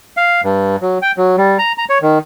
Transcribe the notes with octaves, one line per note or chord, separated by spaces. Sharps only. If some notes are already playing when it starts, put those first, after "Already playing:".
F5
G2
F#3
G5
F#3
G3
A#5
A#5
C#5
D#3